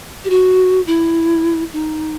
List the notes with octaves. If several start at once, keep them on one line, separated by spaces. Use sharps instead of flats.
G4
F#4
E4
D#4